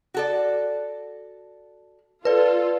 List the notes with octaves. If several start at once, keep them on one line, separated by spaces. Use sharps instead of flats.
F#4 A4 D5
F4 A4 B4 D5